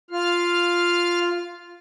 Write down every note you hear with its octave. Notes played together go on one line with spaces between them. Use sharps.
F4 F5 F6